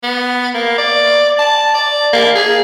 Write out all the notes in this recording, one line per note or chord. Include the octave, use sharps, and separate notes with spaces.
B3
A#3
D5
A5
D5
A#3
G#4